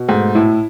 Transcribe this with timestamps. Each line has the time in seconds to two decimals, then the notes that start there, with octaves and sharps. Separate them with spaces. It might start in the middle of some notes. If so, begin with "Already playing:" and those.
Already playing: B2
0.08 G#2 A3
0.35 A2 E4